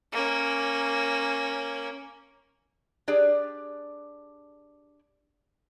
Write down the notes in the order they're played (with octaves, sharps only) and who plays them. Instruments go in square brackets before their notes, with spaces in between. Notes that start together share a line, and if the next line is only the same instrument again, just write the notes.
[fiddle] A#3 C#4
[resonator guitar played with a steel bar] D4 G4 G#4 D5